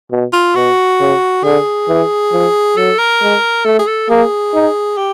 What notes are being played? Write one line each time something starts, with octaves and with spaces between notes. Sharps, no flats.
B2
F4
B2 F#4
C#3
D3 G#4
E3
F3
F#3 A4
A#4
G#3
A3 A4
G#4
A4
A#3 G#4
D#4
G4